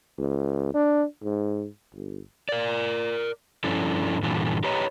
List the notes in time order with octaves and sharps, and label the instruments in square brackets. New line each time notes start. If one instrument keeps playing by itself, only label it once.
[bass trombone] C#2
D4
G#2
G1
[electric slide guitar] A#4 D5
G2 F3 C#4 D4 E4 A4
G2 A#2 D3 E3
G4 B4 C#5 D#5 A#5